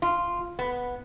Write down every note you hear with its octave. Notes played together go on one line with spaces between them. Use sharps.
F4
B3